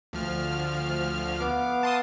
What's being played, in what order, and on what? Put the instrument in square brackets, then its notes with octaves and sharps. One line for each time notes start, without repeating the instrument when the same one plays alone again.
[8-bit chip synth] D2 F3 F6
[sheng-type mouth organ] B3 F5 D6
[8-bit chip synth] A5 C6 D#6